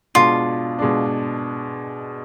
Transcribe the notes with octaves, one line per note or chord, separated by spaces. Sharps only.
B2 G#3 D4 F4
B2 G#3 D4